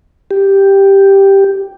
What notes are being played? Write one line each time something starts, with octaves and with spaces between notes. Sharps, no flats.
G4